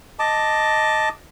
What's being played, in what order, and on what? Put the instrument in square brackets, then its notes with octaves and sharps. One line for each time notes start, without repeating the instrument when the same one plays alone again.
[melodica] D#5 A5 D6